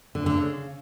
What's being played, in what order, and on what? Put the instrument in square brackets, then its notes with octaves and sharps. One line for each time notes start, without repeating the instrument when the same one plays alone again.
[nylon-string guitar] D3
D3
C#3